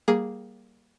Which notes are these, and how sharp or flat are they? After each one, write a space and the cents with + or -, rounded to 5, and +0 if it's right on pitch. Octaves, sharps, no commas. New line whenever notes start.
G3 -15 A#3 +5 G#4 +0